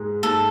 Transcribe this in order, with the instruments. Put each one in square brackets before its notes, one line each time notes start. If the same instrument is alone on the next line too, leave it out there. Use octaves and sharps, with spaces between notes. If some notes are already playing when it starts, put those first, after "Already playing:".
Already playing: [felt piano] G#2 G#3
[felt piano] G#2 [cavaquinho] A4